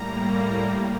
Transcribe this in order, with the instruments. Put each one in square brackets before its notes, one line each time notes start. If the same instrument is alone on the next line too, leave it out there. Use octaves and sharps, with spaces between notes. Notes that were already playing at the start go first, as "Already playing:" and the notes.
Already playing: [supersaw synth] A2 G3 A#3 A#5